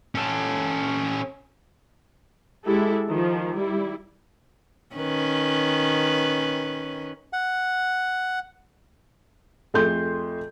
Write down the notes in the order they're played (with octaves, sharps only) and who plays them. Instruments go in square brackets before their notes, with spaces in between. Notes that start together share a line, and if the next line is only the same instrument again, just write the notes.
[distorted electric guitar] C#4 A4
[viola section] G#3 E4 G4 A4
D#3 F3
G3 E4
[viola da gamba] D#3 C#4 B4
[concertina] F#5
[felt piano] F2 A3 G#4 C6 G6